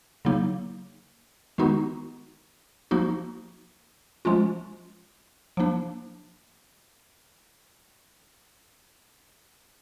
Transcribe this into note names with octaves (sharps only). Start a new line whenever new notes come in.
C#3 F#3 A#3 D#4
D#3 G#3 B3 D#4 F#4
F3 A#3 D#4 F#4
F3 G#3 C#4 F4
F3 A#3 D4